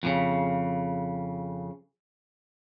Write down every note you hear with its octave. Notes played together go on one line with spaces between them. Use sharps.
F2 A#2 C#3